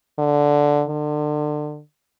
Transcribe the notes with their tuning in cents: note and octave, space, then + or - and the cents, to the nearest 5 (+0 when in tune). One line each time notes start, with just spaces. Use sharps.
D3 -5
D3 +30